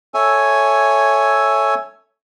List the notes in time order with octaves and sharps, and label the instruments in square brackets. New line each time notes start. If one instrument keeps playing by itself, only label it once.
[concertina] A4 C#5 E5 G#5